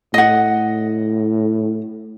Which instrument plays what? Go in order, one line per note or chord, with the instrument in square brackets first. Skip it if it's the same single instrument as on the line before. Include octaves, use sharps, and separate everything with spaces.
[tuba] A2 [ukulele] D#5 F#5